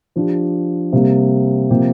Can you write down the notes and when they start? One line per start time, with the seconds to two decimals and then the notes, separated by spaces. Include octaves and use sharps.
0.16 F3 D4 G4
0.93 C3 G3 A#3
1.70 C3 F3 A#3 G4